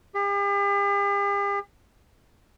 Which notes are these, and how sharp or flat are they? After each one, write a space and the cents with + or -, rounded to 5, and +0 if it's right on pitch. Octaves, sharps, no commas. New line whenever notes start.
G4 +45